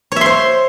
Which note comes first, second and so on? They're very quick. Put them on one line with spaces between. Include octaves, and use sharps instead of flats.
C#5 E5 C6 C5